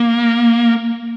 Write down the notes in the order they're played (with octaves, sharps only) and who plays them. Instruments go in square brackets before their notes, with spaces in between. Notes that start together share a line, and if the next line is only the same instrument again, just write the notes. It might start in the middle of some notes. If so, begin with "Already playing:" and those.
Already playing: [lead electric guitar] A#3